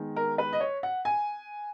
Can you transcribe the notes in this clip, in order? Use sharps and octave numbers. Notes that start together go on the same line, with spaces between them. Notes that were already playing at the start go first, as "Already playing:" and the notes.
Already playing: D#3 G#3 B3
A#4
B4
D#5
C#5
F#5
G#5